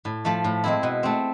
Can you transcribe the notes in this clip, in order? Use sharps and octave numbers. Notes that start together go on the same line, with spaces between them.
A2
F3 A3
A2
G#3 C4 E4
B2
A3 C4